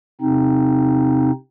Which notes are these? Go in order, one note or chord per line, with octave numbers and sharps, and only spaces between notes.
C3 C4 D#4